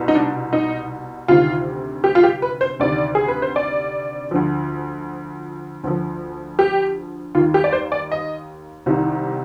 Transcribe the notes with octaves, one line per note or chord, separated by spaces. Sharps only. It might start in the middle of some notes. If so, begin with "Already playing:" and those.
Already playing: C2 B2
D#4
D4
D#4
D2 C3 D#3 F4
G4
F4
G4
B4
C5
D2 C3 D#3 D5
G#4
B4
C5
D5
D2 D3 F3
D2 D3 F3
G4
D#2 D#3 F4
G4
D5
C5
D5
D#5
C2 C3 D#3